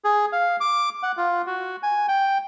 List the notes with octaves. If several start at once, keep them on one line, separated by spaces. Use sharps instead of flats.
G#4
F5
D6
F#5
F4
F#4
G#5
G5